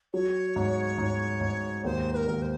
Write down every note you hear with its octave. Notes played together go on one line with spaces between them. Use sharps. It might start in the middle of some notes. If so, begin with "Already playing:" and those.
F#3 C#5
G#2
G#2
G#2
D#2 C5
B4
A#4
D#2
C5